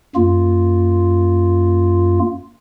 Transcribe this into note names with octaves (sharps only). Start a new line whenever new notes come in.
F#2 A#3 F4